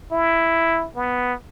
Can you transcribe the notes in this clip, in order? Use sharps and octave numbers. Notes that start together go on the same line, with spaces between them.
E4
B3